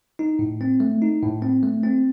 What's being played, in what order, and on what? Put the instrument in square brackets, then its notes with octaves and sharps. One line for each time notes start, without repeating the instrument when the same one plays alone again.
[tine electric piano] D#4
A2
C4
A3
D#4
A2
C4
A3
C4